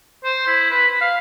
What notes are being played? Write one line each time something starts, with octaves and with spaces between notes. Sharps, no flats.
C5
E4
B4
B5
F5